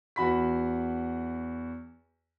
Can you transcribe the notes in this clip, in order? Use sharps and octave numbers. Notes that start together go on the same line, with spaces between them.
E2 F#4 B5 B6